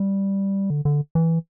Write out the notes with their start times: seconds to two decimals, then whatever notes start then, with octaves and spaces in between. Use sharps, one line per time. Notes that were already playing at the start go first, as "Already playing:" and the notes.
Already playing: G3
0.70 D3
0.85 D3
1.15 E3